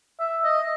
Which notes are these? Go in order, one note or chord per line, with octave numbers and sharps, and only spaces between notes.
E5
D#5